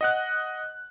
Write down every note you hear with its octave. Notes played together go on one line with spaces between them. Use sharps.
D#5 F#5 F#6